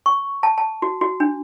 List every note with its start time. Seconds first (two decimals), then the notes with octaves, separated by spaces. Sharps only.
0.06 C#6
0.43 A5
0.58 A5
0.82 F#4
1.01 F#4
1.20 D4